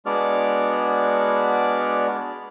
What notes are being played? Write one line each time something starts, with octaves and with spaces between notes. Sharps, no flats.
G#3 B3 D4 F#4 D5 F6